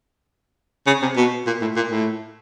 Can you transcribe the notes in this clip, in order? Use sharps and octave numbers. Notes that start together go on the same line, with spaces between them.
C#3
C3
B2
A#2
A2
A#2
A2